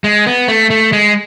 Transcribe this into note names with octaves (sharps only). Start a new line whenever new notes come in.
G#3
B3
A3
A3
G#3